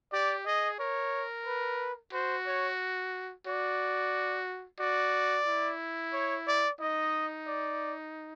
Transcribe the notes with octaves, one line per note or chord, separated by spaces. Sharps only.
G4 D5
G#4 D#5
A#4 C#5
B4
F#4 C5
C#5
F#4 D5
F#4 D5
E4
C#5
D5
D#4 D#5
D5